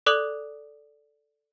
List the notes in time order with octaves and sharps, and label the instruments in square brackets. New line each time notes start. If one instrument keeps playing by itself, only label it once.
[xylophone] A4 D5 D6 D#6 F#6 F#7